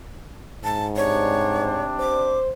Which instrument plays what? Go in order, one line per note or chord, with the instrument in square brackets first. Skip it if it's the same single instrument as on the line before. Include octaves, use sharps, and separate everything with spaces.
[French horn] G#2 [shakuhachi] A5
[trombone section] C3 G3 D4 [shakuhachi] C#5
[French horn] C5 [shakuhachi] D6